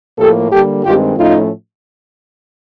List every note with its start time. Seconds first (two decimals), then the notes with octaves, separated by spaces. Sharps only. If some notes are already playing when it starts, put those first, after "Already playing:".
0.18 A2 F3 A#3 G4 A4
0.51 D3 G3 A#3 G4 A4
0.84 G2 D#3 G#3 C4 F4 G4
1.16 A2 F3 A3 C#4 D#4 F4